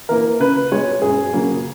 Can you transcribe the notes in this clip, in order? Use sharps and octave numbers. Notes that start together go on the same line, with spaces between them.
E3 A#3 A#4
C#3 B4
G#3 B3 C#5
F#2 G#4
C#3 F#3 A#3